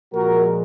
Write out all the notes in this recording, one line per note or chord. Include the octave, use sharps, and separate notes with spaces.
A#2 F3 G#3 F#4 A#4